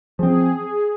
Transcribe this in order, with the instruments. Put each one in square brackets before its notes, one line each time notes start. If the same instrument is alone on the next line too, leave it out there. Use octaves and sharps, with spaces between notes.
[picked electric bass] F3 C4 [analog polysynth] G#4